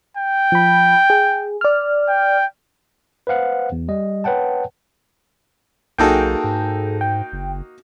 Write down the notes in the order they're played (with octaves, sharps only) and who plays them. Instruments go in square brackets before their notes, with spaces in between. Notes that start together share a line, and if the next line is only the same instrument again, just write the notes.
[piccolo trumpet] G5
[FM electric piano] F3 B5
G#4
D5 F6
[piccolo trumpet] G5
[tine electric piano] B4 C5 F5 F#5
E2
G3 D#5
B4 C#5 F#5 G5 A5
[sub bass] B1 [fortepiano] A#3 D#4 F#4 [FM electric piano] G#4 A4 G5
[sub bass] G#2
[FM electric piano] G5
[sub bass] F#1